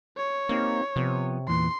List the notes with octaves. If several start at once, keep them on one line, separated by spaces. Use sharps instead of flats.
C#5
A#3 C4 D#4 G4
C3 F3 B3
E2 A#2 E3 C6